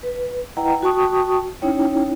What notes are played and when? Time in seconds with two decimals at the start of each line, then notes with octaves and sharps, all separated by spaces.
0.03 B4
0.57 E4 B4 D#5 F#5 G5 A#5
0.82 F#4 G5 A5 C#6 D#6
1.62 C#4 D#4 E4 C#5 G5